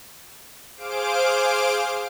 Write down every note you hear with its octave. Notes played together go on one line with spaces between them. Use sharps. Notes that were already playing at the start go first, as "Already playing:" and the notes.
G#4 C5 F5 D6 D7